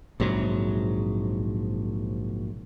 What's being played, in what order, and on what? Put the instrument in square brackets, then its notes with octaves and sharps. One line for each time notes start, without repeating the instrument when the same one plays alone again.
[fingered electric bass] A#1 G#2 C3 F#3